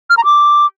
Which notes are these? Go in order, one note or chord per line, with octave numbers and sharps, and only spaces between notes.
F6
A#5
D6